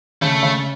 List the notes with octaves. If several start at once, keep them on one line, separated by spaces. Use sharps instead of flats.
C#3 A3
C#3